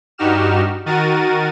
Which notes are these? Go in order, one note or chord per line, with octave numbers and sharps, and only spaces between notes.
G2 D#4 F#4 G4 F6 E7
D#3 F#4 A#4 A6 D#7